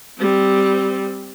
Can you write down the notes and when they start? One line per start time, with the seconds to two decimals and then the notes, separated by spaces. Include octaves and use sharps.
0.18 G3 C4